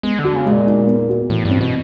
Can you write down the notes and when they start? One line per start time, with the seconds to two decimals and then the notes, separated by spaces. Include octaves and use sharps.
0.03 G#3 B3
0.19 D3
0.24 F#4
0.35 C#3
0.46 G#3
0.51 A#2
0.67 D#4
0.87 B3
1.09 F#4
1.30 A2 E3
1.45 G2
1.51 C4
1.61 B2